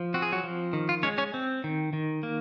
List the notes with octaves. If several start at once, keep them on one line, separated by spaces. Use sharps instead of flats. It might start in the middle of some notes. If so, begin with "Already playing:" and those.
Already playing: F3
C4 F#4
G#4
F#3 F#4
F3
D#3
F4
G#3 C#4 C#5
C#4 C#5
C4
D#3
D#3
A#3